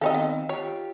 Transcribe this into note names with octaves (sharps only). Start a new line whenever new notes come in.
D#3 C4 A4 C#5 D#5 F5 G5
B3 D#5
F4 G4 C#5